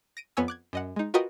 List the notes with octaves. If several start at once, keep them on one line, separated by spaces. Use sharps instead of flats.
A#6 D7 D#7
F2 B3 C#5 G#5 E6
D6 F#6 G#6
F#2 D#5 F#5
G#3 D#4
F4 F#4 A#4 B4 D#5 G5